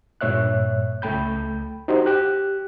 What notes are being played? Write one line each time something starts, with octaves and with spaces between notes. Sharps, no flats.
G2 A#2 C#5 E5 F#6
C#2 A3 G5 B5 G6
D#4 F#4 G4 C5
G4 F#6